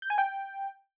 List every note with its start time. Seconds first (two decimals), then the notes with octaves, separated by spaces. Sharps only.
0.02 G6
0.10 G#5
0.18 G5